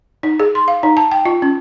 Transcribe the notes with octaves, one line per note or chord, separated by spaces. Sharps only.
D#4
G#4
C6
F5
D#4
A5
G5
F4
C#4